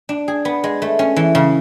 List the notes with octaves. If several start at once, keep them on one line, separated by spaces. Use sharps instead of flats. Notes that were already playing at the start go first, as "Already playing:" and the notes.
D4
G#4
B3
G#3
A3
C#4
E3
C#3